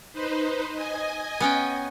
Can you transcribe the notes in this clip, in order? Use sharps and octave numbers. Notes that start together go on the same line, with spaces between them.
D#4 B4 C5
D#5 G#5
B3 C#4 G5